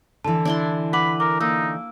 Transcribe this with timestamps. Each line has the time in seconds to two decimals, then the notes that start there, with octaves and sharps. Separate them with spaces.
0.25 D3 E3 A5
0.45 D4 E4 C6
0.93 B4 F#5 B5 D6 F#7
1.20 A#4 D6
1.40 A#3 D#4 E6